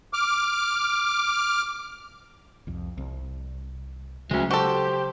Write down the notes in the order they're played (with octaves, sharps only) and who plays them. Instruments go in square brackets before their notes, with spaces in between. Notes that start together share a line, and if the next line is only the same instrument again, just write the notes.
[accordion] D6 F6
[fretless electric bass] C2 F2
C2
[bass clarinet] D2 [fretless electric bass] C#3 F#3 [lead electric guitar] G#3 C#4
[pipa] F#4 A4 [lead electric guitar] G4 [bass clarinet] C5